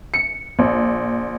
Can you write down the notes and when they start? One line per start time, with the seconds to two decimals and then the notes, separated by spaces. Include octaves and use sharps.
0.14 C#7
0.59 A#1